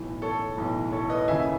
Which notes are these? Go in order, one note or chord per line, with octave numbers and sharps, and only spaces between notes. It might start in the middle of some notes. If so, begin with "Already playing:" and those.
Already playing: B1 A2 E3
A4 C#5
B1 A2 E3
A4 C#5
B4 D#5
D#2 C#3 E3 E5 G#5